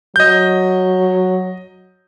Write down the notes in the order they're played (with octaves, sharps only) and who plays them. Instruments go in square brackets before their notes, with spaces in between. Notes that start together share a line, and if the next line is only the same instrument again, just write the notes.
[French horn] F#3 [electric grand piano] D#5 G6